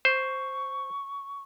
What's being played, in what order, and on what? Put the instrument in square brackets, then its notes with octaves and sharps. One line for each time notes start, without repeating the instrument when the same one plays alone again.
[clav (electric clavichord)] C5 [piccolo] C#6